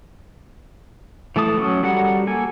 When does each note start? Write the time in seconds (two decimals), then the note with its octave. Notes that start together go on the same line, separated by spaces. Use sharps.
1.36 E3 A3 A5 D#6
1.58 F#3 C#4
1.83 G3 F#4 A4 A#4 F#5
2.27 A#3 A4 G#5